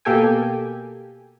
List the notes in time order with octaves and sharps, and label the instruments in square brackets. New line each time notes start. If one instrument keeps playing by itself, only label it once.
[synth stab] B2 A#3 G4 A4 G5 G#5